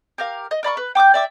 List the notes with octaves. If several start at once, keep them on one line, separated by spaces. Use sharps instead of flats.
G4 A#4 F5
D#5
A#4 D5 B5 C#6
B4
G5 D6 D#6 G6
D5 E5 D6